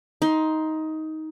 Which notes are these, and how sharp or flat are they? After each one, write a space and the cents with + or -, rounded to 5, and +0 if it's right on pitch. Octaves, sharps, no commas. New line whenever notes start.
D#4 +15 C6 +0